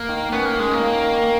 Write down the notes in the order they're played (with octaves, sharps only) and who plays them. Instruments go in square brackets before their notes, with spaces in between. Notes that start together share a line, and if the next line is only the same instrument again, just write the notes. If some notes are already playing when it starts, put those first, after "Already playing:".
Already playing: [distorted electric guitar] A#3
[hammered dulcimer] D#3
[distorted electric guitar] B3 [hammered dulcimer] C#4
[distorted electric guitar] A#3
[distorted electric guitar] G#3 [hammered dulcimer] C#4
[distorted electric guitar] A#3
[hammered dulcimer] D#3
D#3